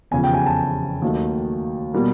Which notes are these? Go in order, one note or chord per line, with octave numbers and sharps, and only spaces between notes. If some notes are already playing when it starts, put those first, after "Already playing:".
F1 E2 C#3 F3 G#5
G5
G#5
A5
D#2 D#3 F#3 A3
B2 G3 A#3